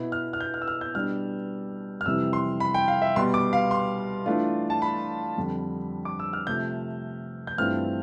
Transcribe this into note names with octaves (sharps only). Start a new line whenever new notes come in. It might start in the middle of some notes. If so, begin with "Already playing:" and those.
Already playing: B2 B3 E4
F6
F6
G6
F6
E6
F6
G6
B2 G3 D4 F6
F6
F2 C3 E3 G3 E6
C6
B5
G5
F5
E5
B2 G3 B3 C6
D6
F5
C6
E3 A3 D4 F4
A5
B5
F2 D3 G3
D6
E6
F6
C3 F3 A3 G6
G6
G2 E3 A3 C4 F4 F6